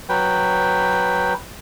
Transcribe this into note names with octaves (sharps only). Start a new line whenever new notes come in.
F#3 B4 G5